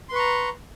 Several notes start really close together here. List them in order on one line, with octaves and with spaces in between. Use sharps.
C6 B4 C#6 A#5